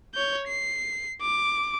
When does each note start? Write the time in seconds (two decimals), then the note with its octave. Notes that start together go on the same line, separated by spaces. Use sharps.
0.14 C#5 G6
0.48 C7
1.21 D6